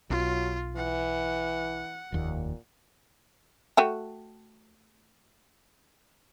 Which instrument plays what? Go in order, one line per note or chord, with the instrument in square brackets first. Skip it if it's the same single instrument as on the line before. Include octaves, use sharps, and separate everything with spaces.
[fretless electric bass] B1 [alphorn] F#3 [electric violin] F4
[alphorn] E3 [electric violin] F#5
[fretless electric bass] F1 D#2 [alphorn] A#2
[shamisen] A3 F#4 G5